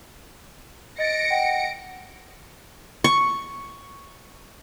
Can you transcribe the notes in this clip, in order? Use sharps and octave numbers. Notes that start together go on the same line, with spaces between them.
D#5 A6 A#6 C#7 D7
D#5 F#5 G5
C#6